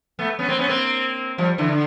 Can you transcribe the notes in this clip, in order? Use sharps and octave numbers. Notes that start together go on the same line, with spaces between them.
A3 B3
B3 C#4
A#3 C4
B3 C#4
A#3 C4
F3 G3
D3 E3
D3